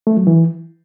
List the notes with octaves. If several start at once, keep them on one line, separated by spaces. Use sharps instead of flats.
A3
F#3
E3